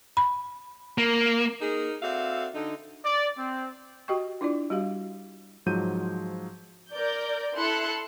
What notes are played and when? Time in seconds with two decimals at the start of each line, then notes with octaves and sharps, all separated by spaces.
0.17 B5
0.98 A#3
1.61 D#4 G#4 A#4
2.03 C4 F#4 A4 D5 E5 F5
2.55 D3 D#4
3.04 D5
3.38 C4
4.08 F#4 G4 D#5 G5 C#6
4.41 D4 E4 F4 D5
4.70 G3 F#4 G4 F5
5.66 G#2 F3 F#3 G6 D#7
6.91 A#4 D5 G6
7.55 E4 A4 C6 F#6 C#7